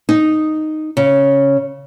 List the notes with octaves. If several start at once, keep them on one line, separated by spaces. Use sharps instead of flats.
D#4
C#3